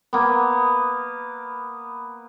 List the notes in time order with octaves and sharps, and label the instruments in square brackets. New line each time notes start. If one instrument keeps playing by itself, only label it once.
[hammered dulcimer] A#3 B3